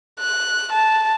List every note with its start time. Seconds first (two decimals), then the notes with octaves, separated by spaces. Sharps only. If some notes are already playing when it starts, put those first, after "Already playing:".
0.20 F#6
0.73 A5